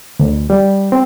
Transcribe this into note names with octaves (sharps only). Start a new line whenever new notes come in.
D2
G3
C4